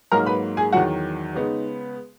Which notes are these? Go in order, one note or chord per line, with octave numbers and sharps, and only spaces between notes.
G#2 F#3 A#3 D#4 A#4 A#5
B4 B5
G#4 G#5
E2 D#3 F#3 F#4 F#5
C#3 G#3 B3 D#4